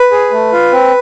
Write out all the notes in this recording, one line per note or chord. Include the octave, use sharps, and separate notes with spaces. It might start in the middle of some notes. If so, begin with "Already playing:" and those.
Already playing: B4
G#4
A3
F4
C4